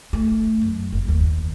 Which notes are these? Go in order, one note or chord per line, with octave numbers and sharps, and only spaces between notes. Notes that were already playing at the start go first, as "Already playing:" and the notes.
A3
F#2
F#1
D#2